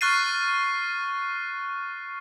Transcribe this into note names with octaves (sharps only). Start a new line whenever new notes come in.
C#6 F6 F#6 A6 C7 D#7